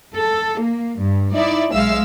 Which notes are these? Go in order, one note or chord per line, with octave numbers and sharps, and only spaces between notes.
A4
A#3
G2
D#4 E4 D5 E5
B1 G#3 E5 F5 E6